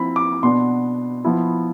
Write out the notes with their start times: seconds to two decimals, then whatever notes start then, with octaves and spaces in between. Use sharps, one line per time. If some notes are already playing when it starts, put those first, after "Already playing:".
Already playing: F3 C4 E4 B5
0.16 D6
0.43 B2 B3 D4 C6
1.25 F3 B3 E4